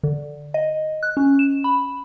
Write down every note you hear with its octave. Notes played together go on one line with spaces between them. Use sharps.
D3
D#5
F#6
C#4
E7
B5